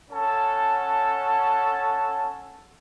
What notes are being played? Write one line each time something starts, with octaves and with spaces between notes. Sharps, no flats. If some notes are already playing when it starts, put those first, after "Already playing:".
C#4 A4 F#5 A5